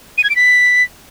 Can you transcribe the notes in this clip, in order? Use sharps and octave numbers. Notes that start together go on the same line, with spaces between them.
D#7
G#6
D7
B6